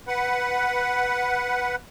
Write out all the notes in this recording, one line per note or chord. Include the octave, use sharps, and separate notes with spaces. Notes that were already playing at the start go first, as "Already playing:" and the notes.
B4 F#5